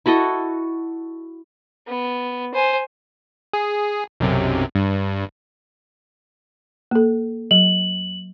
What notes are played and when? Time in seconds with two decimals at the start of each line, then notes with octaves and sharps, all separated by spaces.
0.06 E4 F#4 A4 D#5
1.87 B3
2.54 C5 G#5
3.53 G#4
4.20 B1 F#2 C3
4.75 G2
6.91 A#3 A4
7.51 F#3 F#7